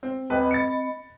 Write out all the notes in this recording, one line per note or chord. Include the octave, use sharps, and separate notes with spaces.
C4
D#1 C4 B4 D#5 B5
A6 C#7